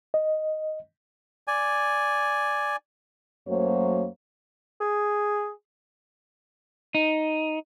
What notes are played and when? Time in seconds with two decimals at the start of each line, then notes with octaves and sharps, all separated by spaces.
0.14 D#5
1.48 D5 G#5
3.48 F#2 F#3 A3 A#3 C5 C#5
4.81 G#4
6.95 D#4